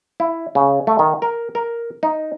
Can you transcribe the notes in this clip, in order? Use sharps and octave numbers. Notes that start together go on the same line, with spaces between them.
E4
C#3
A3
D#3
A#4
A#4
D#4